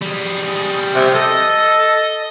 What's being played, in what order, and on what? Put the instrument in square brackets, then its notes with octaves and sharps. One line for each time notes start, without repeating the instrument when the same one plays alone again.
[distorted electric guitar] G3 G#4
[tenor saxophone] C3
[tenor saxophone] A4 [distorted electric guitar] D#5